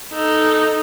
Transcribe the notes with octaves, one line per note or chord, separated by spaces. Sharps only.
D#4 A4